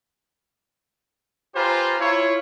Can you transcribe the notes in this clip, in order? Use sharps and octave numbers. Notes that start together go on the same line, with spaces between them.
F4 G4 B4 C5 G#5 A#5
E4 F4 C#5